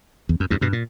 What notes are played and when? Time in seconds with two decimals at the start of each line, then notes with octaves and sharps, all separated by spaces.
0.29 E2
0.40 F#2
0.50 E2 G2
0.61 G2 B2
0.73 A#2